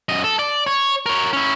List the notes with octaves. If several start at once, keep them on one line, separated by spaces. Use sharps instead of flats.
F#2 D#5
A4
D5
C#5
A#4 C#5
C#4 E4